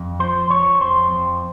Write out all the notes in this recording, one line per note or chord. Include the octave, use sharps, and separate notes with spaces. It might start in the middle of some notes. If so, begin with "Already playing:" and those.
Already playing: F2
F3 C5
F3 C#5
F2 C5
F2